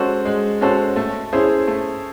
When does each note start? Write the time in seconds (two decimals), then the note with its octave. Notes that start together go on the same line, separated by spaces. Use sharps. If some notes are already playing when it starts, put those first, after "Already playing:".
Already playing: G#3 C#4 F#4 A4 C5
0.25 G#3
0.61 C#4 F#4 A4 C5
0.96 A3
1.33 C#4 E4 G#4 C5
1.67 A3